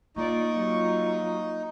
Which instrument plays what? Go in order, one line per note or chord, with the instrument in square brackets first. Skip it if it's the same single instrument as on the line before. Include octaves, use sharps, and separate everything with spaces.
[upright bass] A#3 [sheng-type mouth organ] D#4 [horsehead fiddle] F4 D5 [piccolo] C#6
[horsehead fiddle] F#3 F4